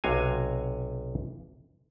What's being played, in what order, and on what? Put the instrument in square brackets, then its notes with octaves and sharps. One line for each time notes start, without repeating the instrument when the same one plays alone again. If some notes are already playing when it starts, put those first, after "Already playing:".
[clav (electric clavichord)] B1 C3 F#4 F5 G#5